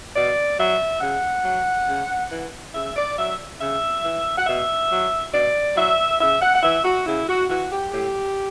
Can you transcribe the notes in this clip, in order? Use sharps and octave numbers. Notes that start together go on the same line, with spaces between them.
B2 D5
F#3 E5
C#3 F#5
F#3
C#3
E3
C#3 E5
D5
F#3 E5
C#3 E5
E3
F#5
B2 E5
F#3
B2 D5
F#3 E5
C#3 E5
F#5
F#5
E3 E5
F#4
C#3 E4
F#4
E3 F#4
G4
A2 G4